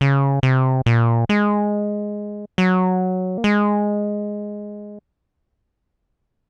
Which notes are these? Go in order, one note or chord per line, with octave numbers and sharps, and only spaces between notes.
C#3
C3
A#2
G#3
F#3
A#3
G#3